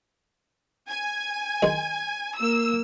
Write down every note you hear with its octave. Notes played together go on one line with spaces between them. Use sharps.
G#5
D#3 G#3
A#3 E6